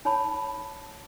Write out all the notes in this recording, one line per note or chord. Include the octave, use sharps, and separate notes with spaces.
D#4 C#5 A5 B5